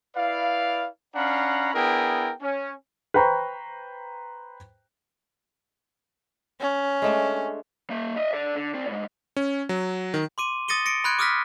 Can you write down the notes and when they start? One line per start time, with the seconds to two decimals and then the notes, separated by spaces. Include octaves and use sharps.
0.16 E4 B4 D5 F5
1.15 C#4 D4 F5 F#5 A#5 B5
1.74 B3 D4 E4 G#4 A#4 G5
2.42 C#4
3.14 B4 C5 G5 A#5 C#6
6.60 C#4
7.02 G#3 A3 D4
7.90 A#3 E5
8.16 D#5 E5
8.33 A4 D5
8.55 D3
8.74 C4 D5
8.88 A2 G#3
9.36 C#4
9.69 F#3
10.14 D#3
10.38 C6 D6 D#7
10.68 D#6 A6 A#6 C#7 D#7 G7
10.86 A#6 C#7 D7
11.04 B5 C6 F#6 G#6 D7
11.19 D6 D#6 F6 F#6 A#6 B6